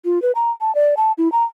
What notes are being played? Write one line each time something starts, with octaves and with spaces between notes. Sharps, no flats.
F4
B4
A#5
A5
D5
A5
E4
A#5